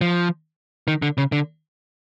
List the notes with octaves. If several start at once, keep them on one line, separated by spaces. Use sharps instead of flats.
F3
D#3
D3
C#3
D3